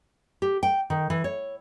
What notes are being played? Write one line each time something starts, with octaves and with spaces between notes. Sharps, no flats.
G4
G5
D#3
E3
C#5